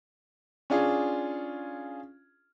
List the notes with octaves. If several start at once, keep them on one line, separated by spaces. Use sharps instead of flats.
C#4 D4 F4 G#4